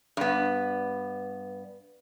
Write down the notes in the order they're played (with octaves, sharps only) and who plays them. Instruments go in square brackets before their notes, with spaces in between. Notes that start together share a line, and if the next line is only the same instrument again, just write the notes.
[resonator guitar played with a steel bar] G2 B3